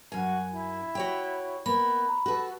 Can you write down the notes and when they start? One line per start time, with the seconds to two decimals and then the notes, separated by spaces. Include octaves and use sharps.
0.12 F#2 F#4 G#5
0.51 E4
0.95 F#4 C#5 G5
1.66 A#3 B3 B5
2.07 A#5
2.26 F#4 A4 B4